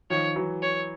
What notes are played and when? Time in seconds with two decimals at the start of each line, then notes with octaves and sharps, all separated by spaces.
0.10 D#3 F3 C#5
0.36 E3 F#3
0.62 C#5